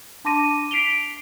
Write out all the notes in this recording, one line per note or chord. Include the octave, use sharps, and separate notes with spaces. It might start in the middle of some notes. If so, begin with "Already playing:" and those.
D4 A5 C6 D6 A#6 D#7
B6 C7 D7 F7 G7